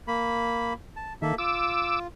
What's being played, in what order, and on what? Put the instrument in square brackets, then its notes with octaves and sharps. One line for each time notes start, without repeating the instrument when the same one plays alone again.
[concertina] A#3 B5
A5
[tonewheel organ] D#3 [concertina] A#3 A4 E5
[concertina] F4 [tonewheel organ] D6 E6